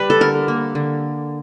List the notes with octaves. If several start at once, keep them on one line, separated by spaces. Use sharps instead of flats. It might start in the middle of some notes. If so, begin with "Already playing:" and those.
Already playing: G3 B4
A4
D3 A#4
A#3
D3